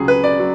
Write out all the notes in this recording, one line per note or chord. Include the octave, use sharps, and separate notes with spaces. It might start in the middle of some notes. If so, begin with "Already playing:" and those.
Already playing: C#2 C#3 F#3 G#4
B4
D5
F#3